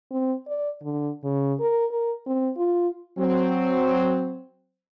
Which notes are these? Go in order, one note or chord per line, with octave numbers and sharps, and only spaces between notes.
C4
D5
D3
C#3
A#4
A#4
C4
F4
F#3 C4